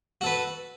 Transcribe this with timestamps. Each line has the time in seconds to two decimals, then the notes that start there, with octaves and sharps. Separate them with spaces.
0.21 F#4
0.24 A4
0.26 B4